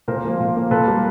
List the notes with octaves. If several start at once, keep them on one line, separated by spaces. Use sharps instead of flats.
A#2 A#4 C5
F3 A#3
A#2
F3 A#3
A#2 A4 B4
G3 A#3